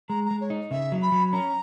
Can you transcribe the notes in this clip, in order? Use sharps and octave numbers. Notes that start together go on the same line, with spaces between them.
G#3 A#5
A#5
G#3
C#5
D#4
C#3 E5
F#3
B5
F#3
C#4 A#5